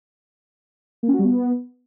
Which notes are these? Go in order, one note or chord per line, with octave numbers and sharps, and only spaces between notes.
A#3
C#4
F#4
G3
B3